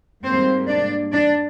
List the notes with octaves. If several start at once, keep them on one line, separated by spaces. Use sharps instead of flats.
G#2 G3 A#3 C4 C5
D4 D5
D4 D5